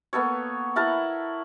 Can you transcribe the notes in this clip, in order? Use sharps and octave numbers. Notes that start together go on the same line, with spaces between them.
A#3 B3 A4 C#5
E4 A#4 F#5 A5